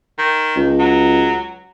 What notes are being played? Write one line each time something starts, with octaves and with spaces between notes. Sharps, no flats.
D#3
C#2
F#3